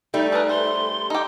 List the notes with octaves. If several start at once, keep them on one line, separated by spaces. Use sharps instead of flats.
G3 A3 D#4
G#4 A#4 B4
C5 C6
D#4 G4